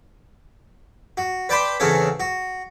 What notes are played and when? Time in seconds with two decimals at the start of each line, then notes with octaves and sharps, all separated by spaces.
1.17 F#4
1.49 B4 D5 G5 A5 B5 C6
1.80 E2 C#3 C4 A4 C#5
2.20 F#4